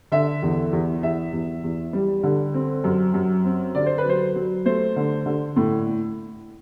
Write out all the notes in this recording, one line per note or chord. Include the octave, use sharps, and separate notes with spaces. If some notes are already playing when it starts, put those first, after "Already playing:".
D3 E5
E2
E2
E2 E5
E2
E2
G3
D3
C4
F#2
F#2
C4
D3 D5
C5
B4
F#3 C5
F#3
A3 C5
D3
D3
A2